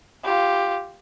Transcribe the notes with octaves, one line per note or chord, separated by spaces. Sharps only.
F4 G4